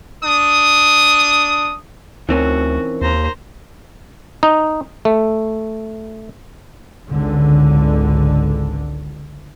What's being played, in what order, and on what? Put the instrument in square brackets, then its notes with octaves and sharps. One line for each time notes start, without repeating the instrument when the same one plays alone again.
[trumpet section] D4 D#6
[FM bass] D2 [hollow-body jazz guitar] E3 C4 C#4 [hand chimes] D#4 A#4 [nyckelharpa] F#4
[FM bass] D#2 [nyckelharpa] C5 A#5
[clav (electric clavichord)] D#4
A3
[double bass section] G#1 C#2 D3